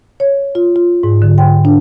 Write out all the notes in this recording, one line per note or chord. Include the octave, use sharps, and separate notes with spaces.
C#5
F4
F4
G#2
D3
G5
D4